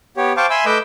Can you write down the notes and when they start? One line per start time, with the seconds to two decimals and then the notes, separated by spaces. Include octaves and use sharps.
0.17 B3 G4 C#5
0.37 C5 F5 G5 A5 C#6 D6
0.50 E5 G#5 B5 C6 E6
0.66 A3 B4 D#5 D6 E6 G6